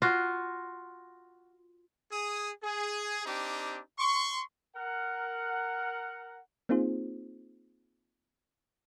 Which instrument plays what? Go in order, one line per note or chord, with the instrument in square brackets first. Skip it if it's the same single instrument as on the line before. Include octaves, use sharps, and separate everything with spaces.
[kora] F4 F#4
[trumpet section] G#4 D#6
G#4
C4 D4 D#4 G4
C6 C#6
[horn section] A#4 F#5
[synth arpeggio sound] A#3 C4 D#4 F4 G#4 C5